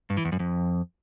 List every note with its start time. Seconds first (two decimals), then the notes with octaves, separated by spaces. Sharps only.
0.10 G2
0.17 E3
0.25 E2
0.32 F#2
0.40 F2